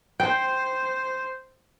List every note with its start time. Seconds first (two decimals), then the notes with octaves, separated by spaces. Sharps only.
0.20 C5 G5